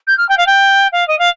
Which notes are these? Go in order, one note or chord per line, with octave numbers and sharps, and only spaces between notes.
G6
F6
G5
F5
G5
F5
D#5
F5